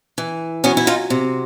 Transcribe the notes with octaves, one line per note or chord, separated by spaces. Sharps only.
E3
F#3 B3 C#4
E4
D#4 F4
C3